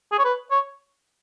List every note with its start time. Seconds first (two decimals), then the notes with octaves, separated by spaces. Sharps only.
0.12 G#4
0.19 C#5
0.25 B4
0.51 C#5